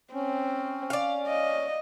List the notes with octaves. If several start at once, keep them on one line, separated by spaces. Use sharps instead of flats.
C4 C#4
D5 F5
D#5